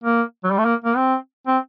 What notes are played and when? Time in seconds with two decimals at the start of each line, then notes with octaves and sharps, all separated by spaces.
0.04 A#3
0.44 F#3
0.51 G3
0.58 A3
0.65 A#3
0.84 A#3
0.97 C4
1.47 C4